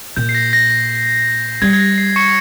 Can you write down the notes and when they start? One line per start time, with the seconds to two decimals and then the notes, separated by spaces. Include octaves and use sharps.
0.16 A#2 G6
0.29 C7
0.35 A#6
0.53 A#6
0.71 A#6
1.62 G3 G#6
1.73 G#6
1.79 A#6
1.98 C7
2.16 C#6 C#7